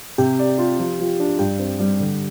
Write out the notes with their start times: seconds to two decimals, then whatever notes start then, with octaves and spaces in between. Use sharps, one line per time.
0.18 C3 G4
0.39 D5
0.58 F4
0.79 F3
0.99 F3
1.20 D4
1.39 G2 G4
1.59 C4
1.80 G3
2.00 D3